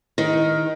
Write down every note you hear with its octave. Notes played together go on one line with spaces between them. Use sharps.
D#3